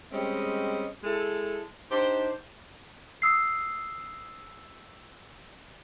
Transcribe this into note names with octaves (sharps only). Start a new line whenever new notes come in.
G3 G#3 C4 C#4 D#5
G#3 E4 A4
D4 D#4 G4 C5
D#6 E6 C7